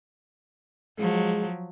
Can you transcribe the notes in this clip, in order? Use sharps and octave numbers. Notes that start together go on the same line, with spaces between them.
F3 F#3 G#3